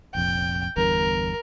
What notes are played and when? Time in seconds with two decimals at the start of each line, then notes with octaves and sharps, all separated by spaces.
0.15 F1 A#1 F2 G5
0.77 G1 E2 G2 A#4